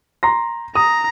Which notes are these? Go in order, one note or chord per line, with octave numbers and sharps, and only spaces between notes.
A#5 C6 A#6
A#5 D#6